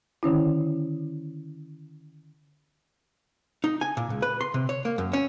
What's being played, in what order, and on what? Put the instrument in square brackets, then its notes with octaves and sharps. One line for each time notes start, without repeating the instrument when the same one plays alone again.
[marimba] D3 D#3 C#4 E4
[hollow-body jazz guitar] D#4
G#5
A#2
C#2
B4
C6
C3
C#5
A#3
F#2
C#4